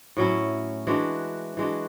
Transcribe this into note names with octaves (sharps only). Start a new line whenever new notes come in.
A2 F#3 C#4 E4
E3 G#3 D4 F#4
E3 G#3 D4 F#4